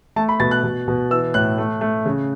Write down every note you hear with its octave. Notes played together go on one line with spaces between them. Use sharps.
A3 A5
B5
B2 A6
F#6
B2
B2
E3 E6
A2 F#6
A3
A3
C#3